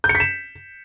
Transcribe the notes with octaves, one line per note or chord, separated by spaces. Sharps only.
G6
C#7
B6
E7